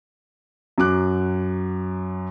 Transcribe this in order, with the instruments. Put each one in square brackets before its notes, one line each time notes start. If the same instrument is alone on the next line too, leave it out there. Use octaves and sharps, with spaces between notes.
[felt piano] F#2 F#3 D6 F#6